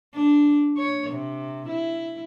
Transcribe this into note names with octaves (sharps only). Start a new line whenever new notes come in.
D4
C#5
C3
E4